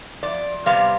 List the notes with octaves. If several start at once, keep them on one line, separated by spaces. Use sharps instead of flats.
F2 D5
C3 G3 B3 F5